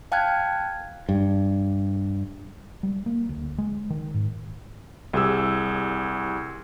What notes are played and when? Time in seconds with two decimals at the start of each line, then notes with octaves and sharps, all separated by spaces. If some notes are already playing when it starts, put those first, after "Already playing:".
0.12 F5 G5 A5 F6 F#6 G#6
1.09 G2
2.83 G3
3.06 A#3
3.29 D2
3.58 G#3
3.90 D#3
4.14 G#2
5.13 C2 G4 G#4 E6